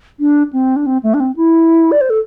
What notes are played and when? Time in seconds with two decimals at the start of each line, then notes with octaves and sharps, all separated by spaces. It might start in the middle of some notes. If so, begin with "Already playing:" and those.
0.20 D4
0.53 C4
0.76 D4
0.86 C4
1.03 A3
1.14 D4
1.20 C4
1.36 E4
1.92 D5
2.01 C5
2.10 A4